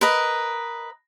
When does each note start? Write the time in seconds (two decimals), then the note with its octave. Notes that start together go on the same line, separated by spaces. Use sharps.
0.01 A#4 B4 D#5